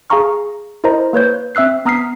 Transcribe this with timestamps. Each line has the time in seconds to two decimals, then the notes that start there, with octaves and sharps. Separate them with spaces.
0.10 G#4 F5 G#5 A#5 C#6 F6
0.84 E4 A#4 C5 D#5 A#5
1.13 A#3 B4 C#5 G6
1.55 C4 E5 E6 F#6 C7
1.85 B3 A#5 D#6 F6 B6 C7